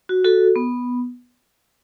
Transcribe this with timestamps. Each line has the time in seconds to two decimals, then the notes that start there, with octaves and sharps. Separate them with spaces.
0.09 F#4
0.24 F#4 A4
0.56 B3